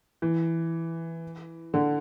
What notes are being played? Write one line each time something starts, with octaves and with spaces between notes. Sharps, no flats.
E3
D3